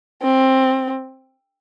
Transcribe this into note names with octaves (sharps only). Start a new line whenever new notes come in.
C4